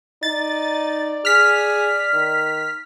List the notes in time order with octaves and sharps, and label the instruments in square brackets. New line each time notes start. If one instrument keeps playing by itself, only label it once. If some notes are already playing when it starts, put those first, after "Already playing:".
[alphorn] D#4 [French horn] D5 [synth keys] A6
[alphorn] G#4 [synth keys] F6 B6
[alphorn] D#3